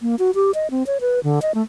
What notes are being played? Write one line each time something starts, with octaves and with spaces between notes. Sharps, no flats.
A#3
F#4
G4
D#5
C4
C#5
B4
D3
D#5
A3